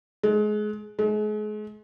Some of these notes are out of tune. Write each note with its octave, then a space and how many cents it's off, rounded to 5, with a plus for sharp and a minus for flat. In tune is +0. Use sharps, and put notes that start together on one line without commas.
G#3 +25
G#3 +35